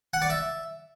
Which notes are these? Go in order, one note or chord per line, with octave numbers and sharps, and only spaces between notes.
F#5
D5
E5